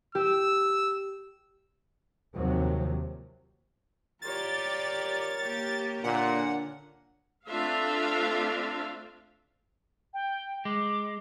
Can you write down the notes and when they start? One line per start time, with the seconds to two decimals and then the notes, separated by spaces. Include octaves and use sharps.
0.15 G4 E6
2.35 D#2 C3 F3 F#3
4.22 F4 G4 A#4 C#5 D5 A6
5.40 A#3 G4
6.04 A#2 D3 F#5
7.47 A3 C4 D4 F4 E5 F5
10.14 G5
10.65 G#3 D6